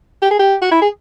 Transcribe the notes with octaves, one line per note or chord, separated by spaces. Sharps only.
G4
G#4
G4
F#4
E4
G#4